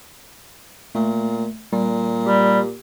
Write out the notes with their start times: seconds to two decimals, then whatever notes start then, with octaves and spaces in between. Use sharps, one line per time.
0.95 A#2 A3
1.72 A#2 G3
2.26 G3 G4